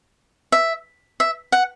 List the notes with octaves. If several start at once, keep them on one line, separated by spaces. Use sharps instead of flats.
E5
E5
F#5